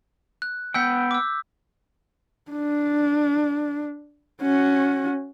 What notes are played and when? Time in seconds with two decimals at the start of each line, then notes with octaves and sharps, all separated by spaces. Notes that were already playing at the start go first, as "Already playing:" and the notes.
0.42 F#6
0.74 B3 F#5 G5 E6 G6 B6
1.11 D6 E6
2.51 D4
4.42 C#4 F#4